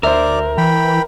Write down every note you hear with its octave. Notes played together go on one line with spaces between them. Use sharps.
D2 A#4 C5 D5 E5
E3 G5 B5